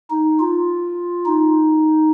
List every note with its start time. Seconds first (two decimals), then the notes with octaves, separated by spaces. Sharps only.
0.11 D#4
0.39 F4
1.26 D#4